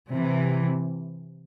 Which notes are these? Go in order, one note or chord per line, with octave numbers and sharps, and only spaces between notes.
C3 E3